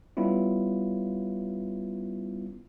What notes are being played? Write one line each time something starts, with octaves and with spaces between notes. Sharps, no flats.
G3 B3 C#4 E4 F4